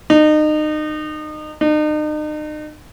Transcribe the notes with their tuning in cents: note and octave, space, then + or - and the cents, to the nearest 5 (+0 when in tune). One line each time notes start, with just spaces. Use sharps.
D#4 -30
D#4 -40